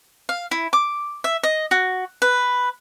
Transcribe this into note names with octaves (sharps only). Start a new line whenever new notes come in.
F5
E4
D6
E5
D#5
F#4
B4